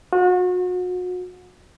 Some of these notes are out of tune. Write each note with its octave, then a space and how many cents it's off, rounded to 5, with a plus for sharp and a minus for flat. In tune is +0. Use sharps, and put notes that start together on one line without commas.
F#4 -35